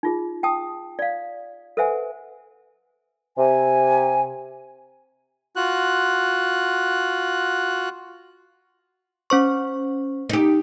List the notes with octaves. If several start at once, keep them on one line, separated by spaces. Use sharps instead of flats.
D#4 F4 G#4
G5 A5 D#6
D5 F5
A4 B4 C5 E5 F#5 G#5
C3 G#5
F4 F#4 F#6
C#4 C5 C#6
D#4 G4